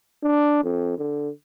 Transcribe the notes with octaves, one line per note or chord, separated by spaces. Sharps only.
D4
F2
D3